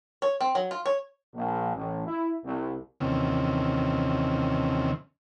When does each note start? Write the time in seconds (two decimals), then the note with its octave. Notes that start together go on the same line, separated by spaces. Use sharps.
0.22 C#5
0.41 C4
0.55 F#3
0.71 F4
0.86 C#5
1.33 A#1
1.74 A1
2.07 E4
2.44 C2
3.00 D#2 C3 D#3 E3 C4 C#4